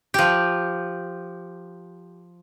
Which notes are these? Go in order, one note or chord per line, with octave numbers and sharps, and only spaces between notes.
F3 G4